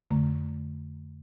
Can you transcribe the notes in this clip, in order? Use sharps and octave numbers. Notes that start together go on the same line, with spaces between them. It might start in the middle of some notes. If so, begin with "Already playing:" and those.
F2 D3 A3 A#5